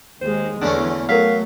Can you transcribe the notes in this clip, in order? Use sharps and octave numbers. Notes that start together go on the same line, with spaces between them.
D#2 G#3 C5
E2 D3 A3 C#4 D4
F#3 A3 A#4 F5 B6